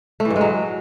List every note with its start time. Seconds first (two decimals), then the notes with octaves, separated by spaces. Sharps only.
0.20 A3
0.25 E3
0.30 G2
0.36 G#3
0.41 F#3